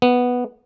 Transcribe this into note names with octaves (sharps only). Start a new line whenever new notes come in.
B3